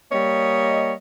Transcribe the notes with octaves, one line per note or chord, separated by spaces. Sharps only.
G3 A#3 C#5 D#5